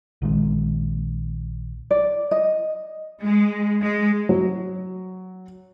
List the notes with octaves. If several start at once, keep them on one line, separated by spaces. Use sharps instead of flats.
A#1 D#3 G#3
D5
D#5
G#3
G#3
F#3